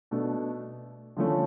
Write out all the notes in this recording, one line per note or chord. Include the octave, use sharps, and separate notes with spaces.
B2 A3 D4
D3 F3 A3 C#4